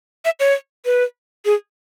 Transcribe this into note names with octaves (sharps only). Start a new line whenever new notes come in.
E5
C#5
B4
G#4